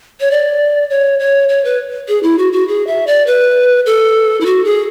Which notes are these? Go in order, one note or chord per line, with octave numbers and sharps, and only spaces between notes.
C#5
D5
C#5
C#5
C#5
B4
G#4
E4
F#4
F#4
G#4
E5
D5
B4
A4
E4
F#4
G#4